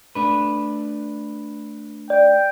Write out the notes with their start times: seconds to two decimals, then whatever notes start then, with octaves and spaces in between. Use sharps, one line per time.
0.15 A3 D4 B4
2.10 D5 G5